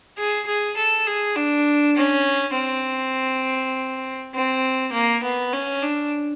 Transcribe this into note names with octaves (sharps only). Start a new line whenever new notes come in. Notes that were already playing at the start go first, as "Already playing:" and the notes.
G#4
G#4
A4
G#4
D4
C#4
C4
C4
A#3
B3
C#4
D4